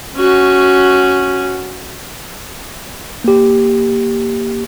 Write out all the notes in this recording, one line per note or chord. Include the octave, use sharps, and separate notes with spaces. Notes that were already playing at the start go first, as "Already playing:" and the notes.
C#4 F#4
A#3 G4